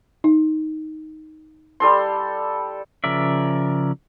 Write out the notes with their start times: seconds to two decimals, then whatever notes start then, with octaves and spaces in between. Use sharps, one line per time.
0.24 D#4
1.80 G3 A4 C6
3.04 C#3 F3 A#4 D5 E5